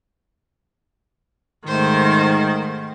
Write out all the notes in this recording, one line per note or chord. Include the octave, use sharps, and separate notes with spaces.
G#2 D#3 A3 C5